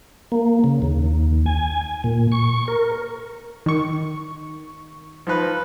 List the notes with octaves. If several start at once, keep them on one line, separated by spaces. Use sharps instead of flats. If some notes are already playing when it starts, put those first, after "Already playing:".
A#3
C#3
D#2
G#5
A#2
C#6
A#4
D#3 C#6
F3 D#4 B4